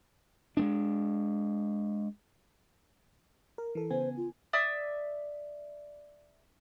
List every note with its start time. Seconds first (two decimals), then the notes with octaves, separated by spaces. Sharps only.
0.57 G#3 A3 D4
3.58 A#4
3.75 E3 A4
3.90 C#3 B3 C5 G#5
4.17 F4
4.53 D5 E5 D#6 E6